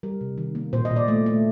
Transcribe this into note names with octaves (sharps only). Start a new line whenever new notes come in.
G3 A#4
C3
D#3
A#3
A#2 C5
D#5
A#2
D5
A3
A3